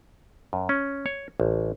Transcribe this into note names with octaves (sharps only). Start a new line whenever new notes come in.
F#2
C#4
C#5
A1